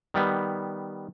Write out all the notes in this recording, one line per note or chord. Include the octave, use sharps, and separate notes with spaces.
D#3 G3 B3